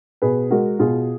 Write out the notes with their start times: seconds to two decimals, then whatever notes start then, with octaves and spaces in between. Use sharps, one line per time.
0.22 B2 G#4 B4
0.50 G#3 F#4 A#4
0.79 B2 F4 G#4